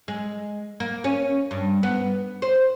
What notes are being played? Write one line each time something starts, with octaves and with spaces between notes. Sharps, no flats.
G#3
A#3
C#4
G2
B3
C5